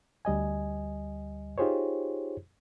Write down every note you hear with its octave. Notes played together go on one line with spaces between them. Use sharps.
D2 G3 D#5 G#5
D#4 F4 G4 G#4 C5 C#5